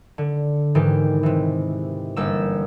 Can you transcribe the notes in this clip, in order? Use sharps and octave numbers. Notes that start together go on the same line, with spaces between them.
D3
G#2 D#3 E3 G4
C3 E3
G1 G3 A#3 E6 E7